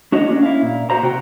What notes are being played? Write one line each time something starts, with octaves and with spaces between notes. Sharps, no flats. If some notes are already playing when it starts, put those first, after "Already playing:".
D4 F#4 C#5 D#5
A#3 C#4 D4
E4 F5
A#2
F#4 C5 A#5
C3 F#4 G5